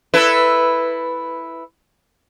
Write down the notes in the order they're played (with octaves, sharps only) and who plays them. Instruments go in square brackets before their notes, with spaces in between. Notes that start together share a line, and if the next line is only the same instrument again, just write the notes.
[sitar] E4 A4 B4